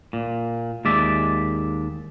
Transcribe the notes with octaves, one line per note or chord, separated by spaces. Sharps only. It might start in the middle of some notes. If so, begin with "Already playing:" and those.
A#2
D#2 G#3 D5 E5